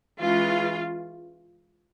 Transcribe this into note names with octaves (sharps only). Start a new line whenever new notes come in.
E3 G#3 C#4 F4